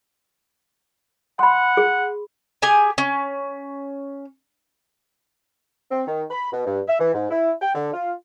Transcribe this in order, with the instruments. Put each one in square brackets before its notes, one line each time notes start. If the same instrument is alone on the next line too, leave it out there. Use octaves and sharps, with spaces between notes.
[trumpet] F#5 [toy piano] B5 C6
[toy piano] G#4
[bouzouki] G4 G#4 G#5
C#4
[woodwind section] C4
D#3
B5
B2
G2
E5
E3
G#2
E4
G5
D3
F4